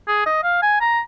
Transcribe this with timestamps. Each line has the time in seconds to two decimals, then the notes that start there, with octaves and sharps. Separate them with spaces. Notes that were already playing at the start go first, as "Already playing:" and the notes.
0.08 G#4
0.26 D#5
0.43 F5
0.62 G#5
0.81 A#5